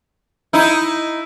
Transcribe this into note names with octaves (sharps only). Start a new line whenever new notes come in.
D#4 E4